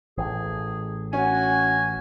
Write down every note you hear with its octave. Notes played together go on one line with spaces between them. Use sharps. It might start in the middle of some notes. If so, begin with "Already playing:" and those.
A1 G#4
C#4 F#4 G#5